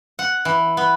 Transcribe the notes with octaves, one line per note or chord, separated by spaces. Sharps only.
F#5
E3
B3